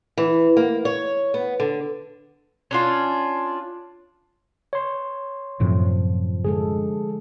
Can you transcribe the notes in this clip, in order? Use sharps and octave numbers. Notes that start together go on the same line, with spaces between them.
E3
A#3
C#5
B3
D3
C#4 D4 F4
C#5 C6
F#2 A2 C3 F3
D3 G#3 G#4 A4